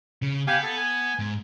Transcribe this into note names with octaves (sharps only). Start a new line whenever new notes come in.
C#3
B3 G4 F5 G#5
A4
G#5
G#2